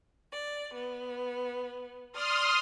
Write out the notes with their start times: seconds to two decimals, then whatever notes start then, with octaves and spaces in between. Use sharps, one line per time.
0.31 D5
0.73 B3
2.12 D5 C6 D#6 F6